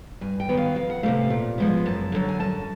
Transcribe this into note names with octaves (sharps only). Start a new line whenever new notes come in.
G2 G#5
G5
D#3 F#3 B3
F5
F2 F5
F#5
C3 E3 A3 F5
A#2
F3 G#3 B3
F#2 A5
D3 F#3
G#5
F#2 A5